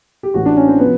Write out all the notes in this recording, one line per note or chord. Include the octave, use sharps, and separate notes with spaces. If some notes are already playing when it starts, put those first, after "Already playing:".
G4
A1 A2 E3 F#4
D4
C#4
C4
C3 F3 B3